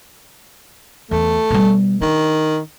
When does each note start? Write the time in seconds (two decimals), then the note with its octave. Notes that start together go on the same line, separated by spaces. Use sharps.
1.11 E2 A3
1.50 B2 G3
2.01 D#3 D4